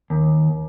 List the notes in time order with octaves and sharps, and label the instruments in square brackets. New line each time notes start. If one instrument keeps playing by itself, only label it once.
[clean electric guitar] D#2